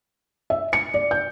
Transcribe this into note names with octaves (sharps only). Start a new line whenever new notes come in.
E5
C#7
D5
G6